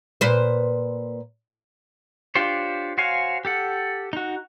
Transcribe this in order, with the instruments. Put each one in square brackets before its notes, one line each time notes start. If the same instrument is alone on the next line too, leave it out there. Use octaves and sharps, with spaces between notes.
[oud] A#2 B4 C5
[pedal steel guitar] D4 F4 G4 C5 C#5
F#4 C5 C#5 F5 G#5
G4 A4 F#5
D#4 F#4